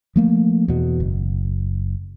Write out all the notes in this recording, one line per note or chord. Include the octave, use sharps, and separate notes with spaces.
F3 A3 A#3
E2 B2
F#1